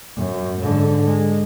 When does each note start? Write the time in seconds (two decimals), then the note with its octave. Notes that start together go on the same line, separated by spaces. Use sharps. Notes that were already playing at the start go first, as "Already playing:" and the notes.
0.16 F#2
0.61 G#2 D3
1.06 G#3